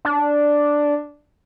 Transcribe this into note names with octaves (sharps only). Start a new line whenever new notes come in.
D4